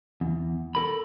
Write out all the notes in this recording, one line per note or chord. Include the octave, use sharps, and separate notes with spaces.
E2
A4 A#4 B5